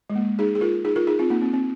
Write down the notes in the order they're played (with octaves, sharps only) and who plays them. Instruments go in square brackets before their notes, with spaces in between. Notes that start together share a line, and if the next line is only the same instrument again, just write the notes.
[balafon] G#3
A#3
D#4 G#4
G#4
F4 A#4
D#4 G#4
F4 A#4
D#4 G#4
C4 F4
A#3 D#4
C4
C4